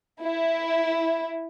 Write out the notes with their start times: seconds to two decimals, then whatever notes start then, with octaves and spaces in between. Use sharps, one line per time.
0.22 E4